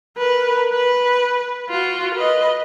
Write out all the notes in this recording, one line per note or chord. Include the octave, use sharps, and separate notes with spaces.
A#4 B4
B4
F4 F#4
B4 D#5